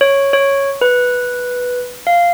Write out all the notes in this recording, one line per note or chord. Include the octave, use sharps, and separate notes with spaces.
C#5
C#5
B4
F5